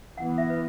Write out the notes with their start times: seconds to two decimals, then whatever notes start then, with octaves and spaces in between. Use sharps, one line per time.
0.17 E3 B3 F#5
0.38 E5
0.50 B4